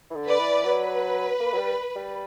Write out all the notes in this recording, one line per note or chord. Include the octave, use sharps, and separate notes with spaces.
E3
D3
B4 D5
E3
F#3 B4
A#3
F#3
G3
G3